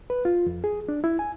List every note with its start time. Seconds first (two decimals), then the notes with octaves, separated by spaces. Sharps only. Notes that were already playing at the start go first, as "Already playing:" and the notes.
0.10 B4
0.25 F4
0.46 F2
0.64 G#4
0.89 D4
1.04 E4
1.19 G#5